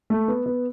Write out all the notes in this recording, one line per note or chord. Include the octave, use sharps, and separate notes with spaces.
A3
B3
B3